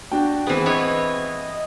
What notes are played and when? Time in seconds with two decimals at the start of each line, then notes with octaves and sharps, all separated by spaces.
0.12 D4 F#4 G5
0.47 E3 B3 C4 G#4
0.66 B3 E4 C#5 D#5